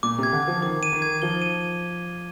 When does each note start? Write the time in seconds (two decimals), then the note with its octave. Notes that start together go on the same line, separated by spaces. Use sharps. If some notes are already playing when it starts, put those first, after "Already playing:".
0.03 A#2 D6
0.18 C3 G#6
0.33 D3
0.43 F3 G#6
0.62 D#3 D6
0.83 D#7
0.93 D#3
1.02 G#6
1.22 F3 G7
1.42 D#7